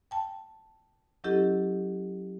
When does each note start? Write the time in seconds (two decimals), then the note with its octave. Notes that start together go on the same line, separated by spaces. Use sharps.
0.11 G5 A5
1.24 F#3 C#4 E4 G4 A4 D#5